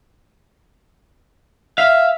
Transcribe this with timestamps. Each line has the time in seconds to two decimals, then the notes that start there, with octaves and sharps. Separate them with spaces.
1.78 E5 F5